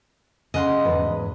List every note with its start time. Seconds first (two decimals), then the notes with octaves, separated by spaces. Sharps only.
0.54 C#3 D#5 F#5 C6
0.85 E2 G#2 B4